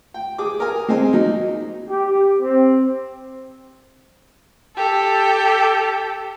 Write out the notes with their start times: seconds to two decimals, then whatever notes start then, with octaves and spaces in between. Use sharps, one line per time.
0.14 G5
0.38 G#4 D6
0.60 A#4 G#5
0.88 G#3 C4 D#5 G#5
1.13 F#3 A#3 D#4
1.90 G4
2.40 C4
4.76 G4 A4